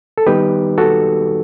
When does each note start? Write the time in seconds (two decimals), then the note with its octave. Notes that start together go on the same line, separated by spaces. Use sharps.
0.18 A4
0.27 D#3 G3 B3 D#4 G4 B4
0.78 F#4 A4